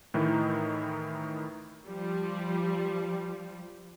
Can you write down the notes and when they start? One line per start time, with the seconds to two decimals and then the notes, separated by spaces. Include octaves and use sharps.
0.14 A2 D#3 E3 D#4 E4
1.87 F3 G3